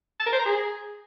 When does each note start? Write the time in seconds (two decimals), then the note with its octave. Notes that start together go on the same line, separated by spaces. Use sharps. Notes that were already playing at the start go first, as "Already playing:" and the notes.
0.20 A5
0.26 A#4
0.33 C5
0.39 A#5
0.46 G#4